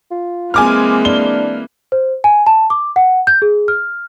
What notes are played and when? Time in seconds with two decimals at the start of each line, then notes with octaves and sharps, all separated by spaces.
0.11 F4
0.54 E3 G#3 A#3 C4 G#5 D6 F6
1.05 D4 G7
1.92 C5
2.24 G#5
2.46 A5
2.70 D6
2.96 F#5
3.27 G6
3.42 G#4
3.68 F6